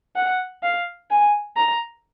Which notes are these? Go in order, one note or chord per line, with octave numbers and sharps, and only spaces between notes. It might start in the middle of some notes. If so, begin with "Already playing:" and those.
F#5
F5
G#5
A#5